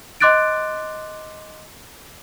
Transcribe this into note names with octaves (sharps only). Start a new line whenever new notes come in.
D#5 C6 D6 F#6 A6 D7